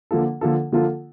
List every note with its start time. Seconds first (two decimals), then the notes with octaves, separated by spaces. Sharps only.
0.11 D3 F3 A#3 F4 A4
0.41 D3 F3 A#3 F4 A4
0.72 D3 F3 A#3 F4 A4